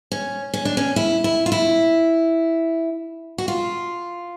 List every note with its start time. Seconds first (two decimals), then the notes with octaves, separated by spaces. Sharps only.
0.11 C#4
0.54 C#4
0.65 D4
0.77 C#4
0.96 E4
1.24 E4
1.46 F4
1.52 E4
3.38 F#4
3.48 F4